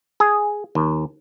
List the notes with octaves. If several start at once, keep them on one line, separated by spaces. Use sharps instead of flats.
G#4
D#2